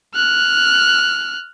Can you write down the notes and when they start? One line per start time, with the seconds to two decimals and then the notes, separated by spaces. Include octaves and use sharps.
0.15 F6 F#6